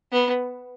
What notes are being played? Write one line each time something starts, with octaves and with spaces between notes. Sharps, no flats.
B3